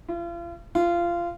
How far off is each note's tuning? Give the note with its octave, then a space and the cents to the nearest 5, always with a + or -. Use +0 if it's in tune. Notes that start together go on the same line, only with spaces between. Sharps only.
F4 -40
F4 -20